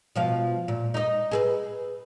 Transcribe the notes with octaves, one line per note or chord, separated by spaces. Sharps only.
B2 F3 F5
A#2
D#4 D#5
G#4 A4 B4